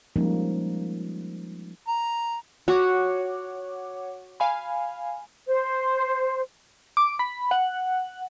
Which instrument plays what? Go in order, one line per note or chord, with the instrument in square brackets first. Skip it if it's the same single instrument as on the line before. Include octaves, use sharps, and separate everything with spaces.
[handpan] F3 G3 G#3 A#3 C#4 D#4
[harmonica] A#5
[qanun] F#4 [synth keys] C#5 F#5 D6
[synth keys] F5 G#5 B5
[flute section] C5
[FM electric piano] D6
B5
F#5